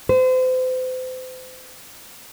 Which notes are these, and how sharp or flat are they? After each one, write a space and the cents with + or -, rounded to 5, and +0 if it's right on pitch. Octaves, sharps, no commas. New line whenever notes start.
C5 -35